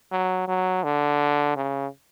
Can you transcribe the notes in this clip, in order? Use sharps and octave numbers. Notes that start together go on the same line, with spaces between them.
F#3
F#3
D3
C#3